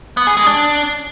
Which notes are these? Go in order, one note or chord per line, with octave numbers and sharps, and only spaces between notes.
B3
G#4
G#3
D4